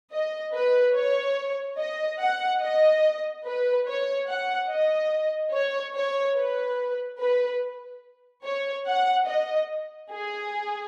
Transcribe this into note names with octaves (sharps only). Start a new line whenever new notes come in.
D#5
B4
C#5
D#5
F#5
D#5
B4
C#5
F#5
D#5
C#5
C#5
B4
B4
C#5
F#5
D#5
G#4